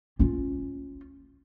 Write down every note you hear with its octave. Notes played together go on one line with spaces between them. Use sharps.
C#4 F4